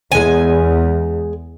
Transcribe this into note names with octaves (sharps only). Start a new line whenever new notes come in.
E2 G#3 G#5